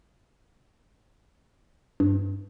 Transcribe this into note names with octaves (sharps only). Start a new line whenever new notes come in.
G2